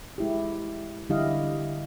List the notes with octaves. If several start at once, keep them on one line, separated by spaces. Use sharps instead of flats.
G#3 E4 G4
D3 G3 E4 G4 D#5 F5